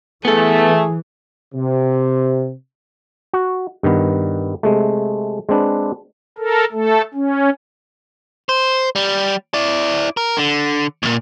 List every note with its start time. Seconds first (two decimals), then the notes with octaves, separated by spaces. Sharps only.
0.25 E3 A3 B3 G#4 A4
1.54 C3
3.33 F#4
3.83 G2 D#3 B3
4.63 C3 G#3 A3
5.49 G#3 C4 D4 B4
6.38 A4 A#4
6.72 A3 A4
7.14 C#4
8.49 C5
8.96 G3
9.54 E4 D5
10.17 A#4
10.37 D3
11.03 D#2 A#2